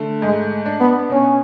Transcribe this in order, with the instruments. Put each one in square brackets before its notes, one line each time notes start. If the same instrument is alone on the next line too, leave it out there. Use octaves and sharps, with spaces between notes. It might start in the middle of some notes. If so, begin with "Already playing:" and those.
Already playing: [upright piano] D3 A3
[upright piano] G#2 [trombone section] G#3
[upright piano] D4
[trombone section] B3
[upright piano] B2 [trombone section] C#4